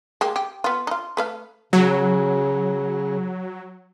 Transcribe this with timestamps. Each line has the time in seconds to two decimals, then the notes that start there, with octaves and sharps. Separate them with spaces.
0.21 G#3 A#3 G4
0.36 G4
0.64 B3 F4
0.87 D#4 F4
1.17 A3 B4 F5
1.73 C#3 F#3